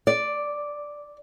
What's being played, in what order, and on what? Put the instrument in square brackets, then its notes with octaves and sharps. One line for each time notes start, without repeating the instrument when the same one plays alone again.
[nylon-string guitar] D5